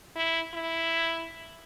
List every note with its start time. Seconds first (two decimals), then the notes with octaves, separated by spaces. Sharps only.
0.16 E4
0.54 E4